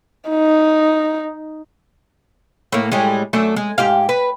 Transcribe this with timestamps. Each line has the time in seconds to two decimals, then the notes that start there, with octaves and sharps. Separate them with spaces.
0.30 D#4
2.72 A2 A#3
2.92 A2 G3 G#3
3.33 F#2 A3 D4
3.56 G#3
3.78 G#2 G4 F5
4.09 B4